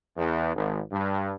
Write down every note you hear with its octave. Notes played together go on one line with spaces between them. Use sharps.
E2
G#1
G2